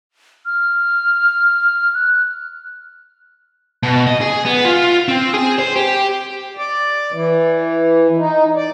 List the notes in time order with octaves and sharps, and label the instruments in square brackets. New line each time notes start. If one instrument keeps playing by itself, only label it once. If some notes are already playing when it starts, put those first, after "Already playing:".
[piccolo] F6
F#6
[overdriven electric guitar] B2
D#5
G#4
B3
F4
C4
G#4
C5
G4
[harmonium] D5
E3
D#4
D5